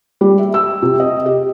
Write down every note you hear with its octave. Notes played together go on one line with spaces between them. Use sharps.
G3
E5
E6
C3
D#5
G4